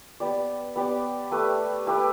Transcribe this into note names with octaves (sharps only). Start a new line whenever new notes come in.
B3 G4 D5
B3 G4 D5
A3 G4 B4
A3 G4 B4